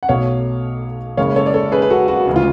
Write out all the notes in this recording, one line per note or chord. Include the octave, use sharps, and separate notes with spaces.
F#5
B1 B2 A3 C#5 F5
F#1 F#2 C#3 G#3 C#5 F5
A4 C#5
D5
A4 C#5
G#4 B4
B4
F#4 A4
F#4
D2 C#3 G#3
F4